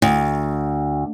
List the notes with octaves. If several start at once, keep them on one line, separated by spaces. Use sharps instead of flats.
D2